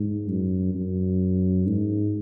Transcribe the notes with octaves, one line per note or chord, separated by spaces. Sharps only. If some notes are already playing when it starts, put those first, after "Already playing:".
Already playing: G#2
F#2
F#2
G#2